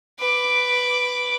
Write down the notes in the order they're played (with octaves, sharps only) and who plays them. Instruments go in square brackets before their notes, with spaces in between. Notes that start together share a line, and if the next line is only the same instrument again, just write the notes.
[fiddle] B4 D6